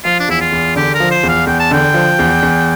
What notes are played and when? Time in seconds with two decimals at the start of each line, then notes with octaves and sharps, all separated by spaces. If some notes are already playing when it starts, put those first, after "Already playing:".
0.05 F3 F4
0.20 D4
0.28 E2 E4
0.41 F4
0.52 E2
0.76 D3 G4
0.94 A#4
1.00 F3
1.11 C5
1.23 E2
1.29 F5
1.47 E2 G5
1.60 A5
1.71 D3 G5
1.94 F3
2.19 E2
2.42 E2